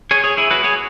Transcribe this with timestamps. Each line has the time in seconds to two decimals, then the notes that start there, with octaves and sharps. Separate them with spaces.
0.11 G#4 C#5
0.24 G#4 C#5
0.37 E4 G#4
0.51 F#4 B4
0.64 G#4 C#5